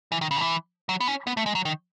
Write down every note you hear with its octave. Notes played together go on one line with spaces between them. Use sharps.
E3
D#3
C#3
D#3
E3
F#3
B3
C#4
B3
A3
G#3
F#3
D#3